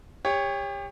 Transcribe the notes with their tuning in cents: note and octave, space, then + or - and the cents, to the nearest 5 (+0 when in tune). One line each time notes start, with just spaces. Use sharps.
G4 +35 C#5 +0